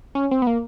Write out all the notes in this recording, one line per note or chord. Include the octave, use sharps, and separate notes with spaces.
C#4
C4
B3
A#3